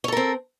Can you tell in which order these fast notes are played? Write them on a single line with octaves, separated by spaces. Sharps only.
C#5 A4 A#4 C4